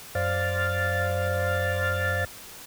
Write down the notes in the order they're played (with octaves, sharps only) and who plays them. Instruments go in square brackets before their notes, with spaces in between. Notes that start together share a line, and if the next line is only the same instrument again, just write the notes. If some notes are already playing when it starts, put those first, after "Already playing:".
[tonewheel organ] F#2 C5 D5 F5 F6 A6